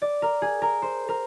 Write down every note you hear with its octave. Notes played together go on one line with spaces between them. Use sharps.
D5
A#4
G#4
A#4
C5
A#4